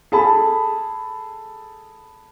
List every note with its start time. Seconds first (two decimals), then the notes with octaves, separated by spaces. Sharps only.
0.12 G#4 A4 A5 B5